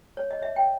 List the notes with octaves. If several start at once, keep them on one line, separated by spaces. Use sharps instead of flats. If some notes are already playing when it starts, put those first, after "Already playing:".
C#5
D#5
C#5 E5
C#5 G5